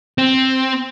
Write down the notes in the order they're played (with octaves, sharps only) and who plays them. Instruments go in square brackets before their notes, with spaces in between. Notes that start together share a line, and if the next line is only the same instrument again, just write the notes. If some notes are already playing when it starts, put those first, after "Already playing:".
[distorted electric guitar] C4